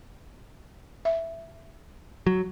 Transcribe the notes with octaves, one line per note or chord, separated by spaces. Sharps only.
E5
F#3